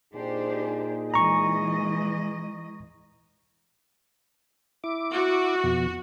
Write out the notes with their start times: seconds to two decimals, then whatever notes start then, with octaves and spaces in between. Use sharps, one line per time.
0.14 A#2 D4 D#4 G4 G#4 C5
1.14 E3 G#3 D#5 A#5 C#6
4.84 E4 D6
5.14 F#4
5.64 F2 B2